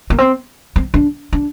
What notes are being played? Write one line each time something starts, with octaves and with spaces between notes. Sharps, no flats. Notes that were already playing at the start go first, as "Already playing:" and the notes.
A#3
C4
C4
D4
D4